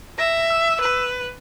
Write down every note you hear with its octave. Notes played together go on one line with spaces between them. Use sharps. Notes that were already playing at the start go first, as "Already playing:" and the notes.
E5 A#6
E6
B4